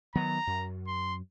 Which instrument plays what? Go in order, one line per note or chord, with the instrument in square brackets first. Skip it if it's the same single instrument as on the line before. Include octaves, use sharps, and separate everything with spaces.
[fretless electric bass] D#3 F#3 B3 [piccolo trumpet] A#5
[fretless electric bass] F#2
[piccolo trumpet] C6